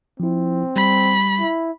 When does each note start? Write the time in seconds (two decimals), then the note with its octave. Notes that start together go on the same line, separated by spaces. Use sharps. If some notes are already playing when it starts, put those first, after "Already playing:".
0.20 F3 C4 E4
0.76 G3 B5
1.40 E4